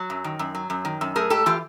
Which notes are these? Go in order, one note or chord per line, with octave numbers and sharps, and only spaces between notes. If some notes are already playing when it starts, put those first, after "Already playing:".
Already playing: F#3
F#2
D#3
F#2
F#3
F#2
D#3
F#2
A3 G#4 A#4
G#2 G4 A4
E3 F4 G4